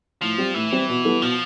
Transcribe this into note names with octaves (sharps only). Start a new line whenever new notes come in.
A2 F3
G3 C4 G4
A2 E3
G3 C4 G4
B2
G3 B3 E4 A4
B2 F3